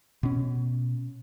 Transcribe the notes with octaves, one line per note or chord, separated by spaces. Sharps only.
B2 C#4